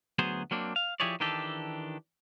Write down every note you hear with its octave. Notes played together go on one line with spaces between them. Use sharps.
D2 F#3 B3 G#4 C5
F#3 A#3 C4 D4
F5
F3 E4 G4 G#4 C#5 D5
D#3 E3 D4 G4 A4